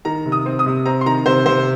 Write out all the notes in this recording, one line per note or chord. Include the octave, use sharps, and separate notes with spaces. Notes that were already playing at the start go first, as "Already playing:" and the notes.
D#3 A#5
C3
D#6
C4
D#6
C3
C4 A#5
C6
D#3 A#5
C3 C5
C3 C5